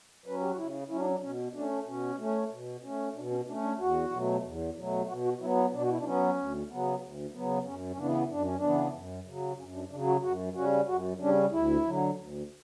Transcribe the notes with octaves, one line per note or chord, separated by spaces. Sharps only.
F#3 C#4 B4
G4
F#4
C#3 E4
F#3 C#4 E4
D4
C#4
D4
B2 C#4
A3 C#4 D4
B2 C#4
A3 C#4
B2
A3 C#4
B2 D4
C#4
A3 C#4 D4
D4
E2 F#4
B2 F#3 A3
E2
B2 F#3 A3
B2 F#4
F#4
F#3 B3 E4
E4
B2 D4
F#4
E4
D4
F#3 B3 C#4
D2
C#3 F#3 B3
D2
C#3 F#3 B3
F#2 C#4
C#4
C#3 E3 B3 D4
F#2 D4
C#4
D4
C#3 E3 B3
F#2
C#3 F#3
F#2 C#4
D4
C#3 F#3 D4
F#4
F#2 F#4
C#3 G3 C#4 F#4
F#2 F#4
C#3 G3 C#4 D4
D2 E4
D3 F#3
D2